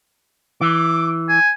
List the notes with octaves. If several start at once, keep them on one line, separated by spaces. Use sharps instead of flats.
E3 D6
G#5